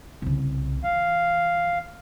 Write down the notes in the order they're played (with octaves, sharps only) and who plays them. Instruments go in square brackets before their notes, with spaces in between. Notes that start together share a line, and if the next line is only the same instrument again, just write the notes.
[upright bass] C2 C#3
[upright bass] E3 [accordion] F5